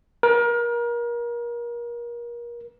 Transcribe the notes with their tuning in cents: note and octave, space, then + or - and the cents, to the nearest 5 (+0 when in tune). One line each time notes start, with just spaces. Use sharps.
A#4 +30